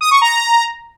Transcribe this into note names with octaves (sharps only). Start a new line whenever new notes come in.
D#6
C#6
A#5